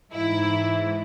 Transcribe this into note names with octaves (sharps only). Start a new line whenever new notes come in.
G#2 E3 E4